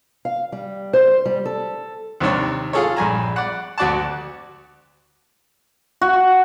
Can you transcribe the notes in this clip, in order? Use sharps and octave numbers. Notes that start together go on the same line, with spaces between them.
F5
G3
C5
G3
A4
D#2 C3 D#3 D4 C#5
F4 G#4 A4 C#5
A#1 G2 G#5 A#5
D5 F#5
D2 F#4 D5 F#5 A5
F#4